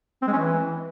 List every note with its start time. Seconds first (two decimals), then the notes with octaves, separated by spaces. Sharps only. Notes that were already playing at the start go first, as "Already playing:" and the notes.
0.22 C4
0.28 G#3
0.33 C#4
0.38 E3